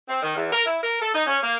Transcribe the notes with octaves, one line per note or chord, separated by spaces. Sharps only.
C4
D#3
E2
A#4
E4
A#4
A4
D#4
C#4
A#3